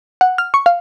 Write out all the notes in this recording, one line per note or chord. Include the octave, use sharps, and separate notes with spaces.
F#5
F6
C#6
F5